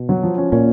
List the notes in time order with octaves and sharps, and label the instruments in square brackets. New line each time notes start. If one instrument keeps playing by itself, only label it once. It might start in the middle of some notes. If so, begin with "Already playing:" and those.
Already playing: [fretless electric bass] B2
[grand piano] F#3
F3
C#4
[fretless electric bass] A#2 [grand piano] C#4